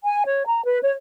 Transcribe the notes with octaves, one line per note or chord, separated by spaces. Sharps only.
G#5
C#5
A#5
B4
C#5